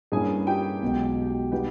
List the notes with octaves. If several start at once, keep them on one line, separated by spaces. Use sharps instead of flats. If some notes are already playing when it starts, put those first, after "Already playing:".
G2 G3 A#3 C#4 E4 G#4 G#5
G4 G5
B1 B2 G#3
G3 B3 D#4 G4 G5